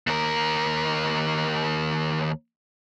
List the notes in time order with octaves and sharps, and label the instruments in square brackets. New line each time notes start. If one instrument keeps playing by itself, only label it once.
[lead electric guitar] D#2 A#4